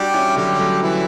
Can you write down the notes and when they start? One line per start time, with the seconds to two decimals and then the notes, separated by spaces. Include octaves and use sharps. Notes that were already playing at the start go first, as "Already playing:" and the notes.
Already playing: G3 D4 F#4 G4
0.14 C#4 E4
0.36 D3 F#3 G3 G4
0.59 F#3 A3
0.83 E3 E4